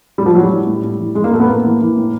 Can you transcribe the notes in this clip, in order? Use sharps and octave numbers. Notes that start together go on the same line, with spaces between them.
A2 G3
F3
E3 F#3
G3
E3
A2
A2
E3
E3 G#3
A#3
A2 A3
B3
A2 A#3
E3
E3
A2